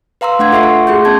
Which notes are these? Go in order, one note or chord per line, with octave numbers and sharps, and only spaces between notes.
B4 F5 A#5 C6 E6
A3 D4 F#5 C6 G#6
F4 A4 E5 C#6 C7
F#5
A3 F#4 G#4 C6 G6
B3 C#4 A5 G#6